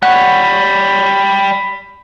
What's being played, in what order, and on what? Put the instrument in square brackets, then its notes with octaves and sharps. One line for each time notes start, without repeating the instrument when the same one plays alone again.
[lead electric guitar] G3 C#5 [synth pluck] F#5 [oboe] B5